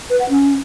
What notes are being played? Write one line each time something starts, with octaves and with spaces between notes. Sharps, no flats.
B4
F#5
C#4